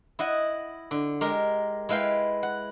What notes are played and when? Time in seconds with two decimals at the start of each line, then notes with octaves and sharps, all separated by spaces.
0.19 E4 D#5 F#5
0.91 D3
1.21 G#3 G4 A#4
1.89 G#3 E4 B4 F5 G5
2.43 F#5